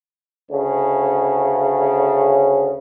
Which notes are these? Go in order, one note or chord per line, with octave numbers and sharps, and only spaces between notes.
D2 C#3